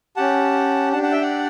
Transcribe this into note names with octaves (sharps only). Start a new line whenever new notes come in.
C#4 G4 F#5 A5
D4 G4 F#5 A5
F#5 A5
E5 G5
D5 F#5